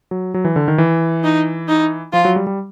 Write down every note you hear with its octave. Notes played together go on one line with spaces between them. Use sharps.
F#3
F#3
E3
D3
D#3
E3
D#4
D#4
F3 F4
F#3
G3
G3